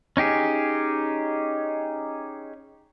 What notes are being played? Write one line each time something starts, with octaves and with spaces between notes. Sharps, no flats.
C#4 D#4 G4 G#4